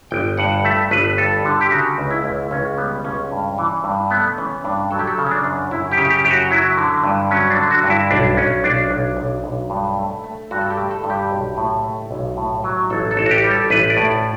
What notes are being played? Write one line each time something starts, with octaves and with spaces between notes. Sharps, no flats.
G1 G5
G2 F#5
A3 E5
G1 B4
G2 A4
D3
G4
C#3 F#4
C#2
E4
C#2
C#2 C#4
G3 B3
C#2 C#4
G2
E3
G2
A3 B3
E3 C#4
G2 D4
F#3 A4
G4
A4
C#3
C#4
D4
F#2
F#2 E4
G4
C#3
G4
F#2 G4
F#4
F#3 E4
D3
G2
F#3 C#4
D4
D3
F#4
G2
E4
B1 D4
B1 C#4
B1 D4
B1
B1
B1
G2
A3
A3
G2 F#4
A4
G4
A3
A4
G2
G4
B1
A2
A3
B1
A2
F#3
A1 A4
A4
A1
F#4
G4
G3
A4
A1 B4
D5
A2
D5